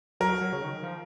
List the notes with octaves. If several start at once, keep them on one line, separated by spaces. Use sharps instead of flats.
F#3 A#4
F#3
C#3
D#3
F3